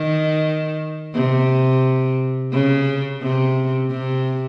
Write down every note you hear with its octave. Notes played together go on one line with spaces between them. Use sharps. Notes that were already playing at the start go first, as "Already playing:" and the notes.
Already playing: D#3
C3
C#3
C3
C3